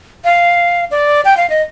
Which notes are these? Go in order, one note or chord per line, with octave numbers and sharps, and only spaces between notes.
F5
D5
G5
F5
D#5